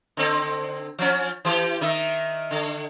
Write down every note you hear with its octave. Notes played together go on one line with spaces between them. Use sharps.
D3 C4
F3 C#4
E3 G4
D#3 D#4 E5
D3